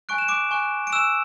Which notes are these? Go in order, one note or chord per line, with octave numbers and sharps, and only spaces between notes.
G#5 C#6 F#6 D7
E7
D6 D7
G#5 C#6 F#6
D7
G#5 C#6 E6 F#6 E7